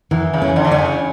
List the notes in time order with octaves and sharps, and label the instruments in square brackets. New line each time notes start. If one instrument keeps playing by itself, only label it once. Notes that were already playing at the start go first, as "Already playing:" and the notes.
[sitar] F#2 [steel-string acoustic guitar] E3
[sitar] C#3
[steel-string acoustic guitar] C#4
[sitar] D3
E3
[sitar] D3 [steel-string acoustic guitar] C#4
[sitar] C#3